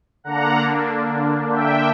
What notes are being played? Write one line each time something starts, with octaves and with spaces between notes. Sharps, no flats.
D3 A#3 D4 F#5 A#5
E5 G5